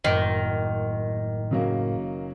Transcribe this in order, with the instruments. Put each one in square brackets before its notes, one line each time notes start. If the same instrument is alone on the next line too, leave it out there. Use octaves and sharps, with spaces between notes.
[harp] F#1 D7 [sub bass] A2 [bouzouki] D#3
[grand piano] C#3 F#3 A#3